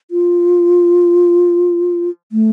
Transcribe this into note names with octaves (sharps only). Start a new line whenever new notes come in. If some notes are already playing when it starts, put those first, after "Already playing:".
F4
A3